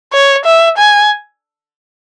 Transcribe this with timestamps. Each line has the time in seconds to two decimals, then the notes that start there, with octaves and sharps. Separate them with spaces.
0.13 C#5
0.45 E5
0.78 G#5